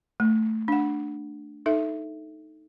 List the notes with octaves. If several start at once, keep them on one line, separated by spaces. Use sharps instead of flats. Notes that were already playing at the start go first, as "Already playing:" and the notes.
A3
D4 F#5
D#4 A4 E5